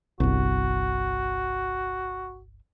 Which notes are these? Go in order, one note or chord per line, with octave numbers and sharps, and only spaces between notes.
G1 C2 F#4